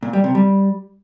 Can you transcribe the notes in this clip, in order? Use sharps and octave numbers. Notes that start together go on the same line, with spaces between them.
A#2
G3
C3
G3